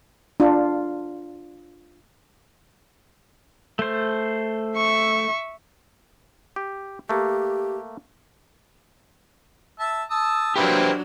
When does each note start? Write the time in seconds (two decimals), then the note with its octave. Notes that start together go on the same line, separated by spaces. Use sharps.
0.40 D4 F4
3.79 A3 C5
4.77 E5 C#6
6.56 G4
7.09 A3 A#3 G4
9.79 E5 A5
10.10 A5 D#6 E6
10.56 F#3 A#3 C4 D4 E4 G4 B4 C5